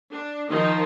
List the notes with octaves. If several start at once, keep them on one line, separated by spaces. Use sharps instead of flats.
D4
D#3 F3 D#4